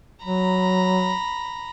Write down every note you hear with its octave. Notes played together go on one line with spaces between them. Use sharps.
F#3 A#5 B5